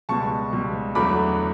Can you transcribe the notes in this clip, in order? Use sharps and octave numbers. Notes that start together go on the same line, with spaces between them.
C#2 B2 G3 A5 C#6
C#2 B2 G3
E2 D3 F#3 A3 B5 D6